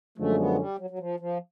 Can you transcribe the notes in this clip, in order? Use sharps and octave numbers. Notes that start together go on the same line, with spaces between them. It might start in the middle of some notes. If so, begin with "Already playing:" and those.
F#2 D3 F3 G#3 A3 C#4
B3
G3
F#3
F#3
F3
F3